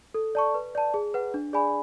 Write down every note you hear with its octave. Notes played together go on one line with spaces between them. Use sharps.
A4
D5 A5 C#6
B4
D5 A5
G#4
B4 F#5
D4
G#4 D5 G#5 B5